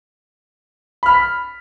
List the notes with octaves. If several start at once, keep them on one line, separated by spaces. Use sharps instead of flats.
B5 F6 B6